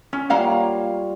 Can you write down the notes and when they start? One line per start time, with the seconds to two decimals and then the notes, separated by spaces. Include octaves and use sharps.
0.13 C#4 C#5
0.30 G3 A#3 F4 F5 F#5